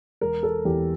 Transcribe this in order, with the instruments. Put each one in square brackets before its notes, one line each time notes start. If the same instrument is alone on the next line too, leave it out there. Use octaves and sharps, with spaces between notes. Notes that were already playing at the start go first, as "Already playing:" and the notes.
[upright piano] E1 A#4
A4
E2 G4